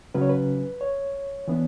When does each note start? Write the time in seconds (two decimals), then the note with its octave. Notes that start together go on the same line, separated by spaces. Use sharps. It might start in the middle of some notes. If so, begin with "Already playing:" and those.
0.15 C#3 F#3 C#4 B4
0.22 C#5
0.29 B4
0.81 C#5
1.48 E3 B3 D4